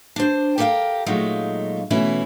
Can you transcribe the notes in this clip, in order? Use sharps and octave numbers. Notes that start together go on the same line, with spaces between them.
D4 C5
G4 A4 A#4 C5 F5 G5
A#2 F#3 G#3 A3 D#4 F4
B2 E3 A3 C#4 E4